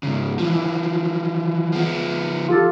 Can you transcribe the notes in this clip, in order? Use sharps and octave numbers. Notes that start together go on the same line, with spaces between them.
G#2 C#3
E3 F3
F3 B3
F4 G4 A4